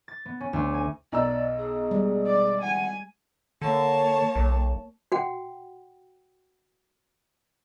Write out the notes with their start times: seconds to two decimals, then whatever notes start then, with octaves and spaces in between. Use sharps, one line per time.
0.08 A6
0.26 B3
0.40 C#4
0.53 D2
0.74 G#5
1.12 B1 D5 A#5 E6
1.58 G#4
1.91 G3 G#3
2.27 D5
2.61 F#5 G#5
3.62 D3 A#3 C#5 A5
4.36 B1
5.12 F#4 F#5 G5